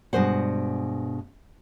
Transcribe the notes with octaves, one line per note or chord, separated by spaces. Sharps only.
G2 B2 G#3 C5 F#5